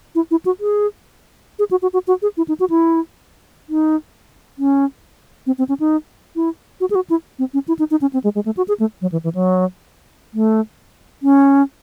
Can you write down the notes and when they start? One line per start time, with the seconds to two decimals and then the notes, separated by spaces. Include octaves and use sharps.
0.15 E4
0.31 E4
0.45 F#4
0.60 G#4
1.59 G#4
1.71 F#4
1.82 F#4
1.93 F#4
2.07 F#4
2.22 G#4
2.37 E4
2.48 D#4
2.60 F#4
2.70 E4
3.69 D#4
4.58 C#4
5.47 C4
5.58 C4
5.69 C#4
5.80 D#4
6.36 E4
6.80 F#4
6.90 G#4
6.95 F#4
7.10 E4
7.39 C4
7.54 C#4
7.68 E4
7.79 D#4
7.91 D#4
8.01 C#4
8.13 C4
8.24 G#3
8.35 G#3
8.45 A3
8.57 F#4
8.68 G#4
8.80 A3
9.01 F#3
9.12 E3
9.24 E3
9.35 F#3
10.34 A3
11.23 C#4